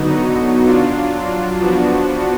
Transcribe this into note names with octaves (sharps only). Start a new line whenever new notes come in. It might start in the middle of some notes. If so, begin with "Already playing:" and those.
Already playing: D3 F#3 B3 D#4 F#4
F#3 D4 F4
F3 B3 D4 F#4